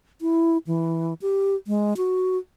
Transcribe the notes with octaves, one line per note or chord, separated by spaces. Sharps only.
E4
E3
G4
G#3
F#4